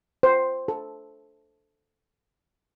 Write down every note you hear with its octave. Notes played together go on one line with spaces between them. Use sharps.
C5
A4